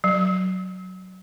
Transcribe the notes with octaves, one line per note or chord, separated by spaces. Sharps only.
F#3